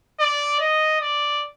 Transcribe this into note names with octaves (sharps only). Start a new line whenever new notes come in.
D5
D#5
D5